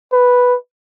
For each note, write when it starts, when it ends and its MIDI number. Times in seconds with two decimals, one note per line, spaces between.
0.13 0.56 71